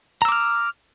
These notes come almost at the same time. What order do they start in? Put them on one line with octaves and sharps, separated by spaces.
A#5 E6 D6 F6